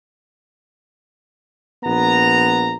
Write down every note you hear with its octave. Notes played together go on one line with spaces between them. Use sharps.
A#1 B3 A#5